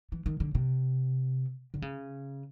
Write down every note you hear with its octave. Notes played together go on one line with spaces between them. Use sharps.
E3
D#3
D3
C3
D3
C#3